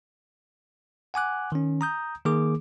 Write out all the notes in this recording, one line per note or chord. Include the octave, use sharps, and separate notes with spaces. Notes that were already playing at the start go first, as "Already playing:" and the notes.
F#5 G#5 D6 F#6
D#3 C#4
A#5 D#6 G6
D#3 A#3 G#4 D6